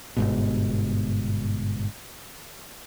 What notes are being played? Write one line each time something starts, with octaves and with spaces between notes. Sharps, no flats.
G1 G#2 B2